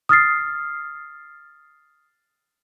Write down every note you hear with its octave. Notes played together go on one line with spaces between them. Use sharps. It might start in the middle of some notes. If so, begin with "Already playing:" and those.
D#6 F6 A6 C7